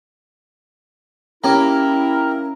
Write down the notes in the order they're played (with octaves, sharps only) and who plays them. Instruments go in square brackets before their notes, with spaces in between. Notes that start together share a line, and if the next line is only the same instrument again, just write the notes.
[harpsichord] A#3 G4 [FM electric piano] C#4 A#5 [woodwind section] E4 A#4